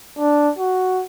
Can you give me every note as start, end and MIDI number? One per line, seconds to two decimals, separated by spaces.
0.18 0.50 62
0.59 1.03 66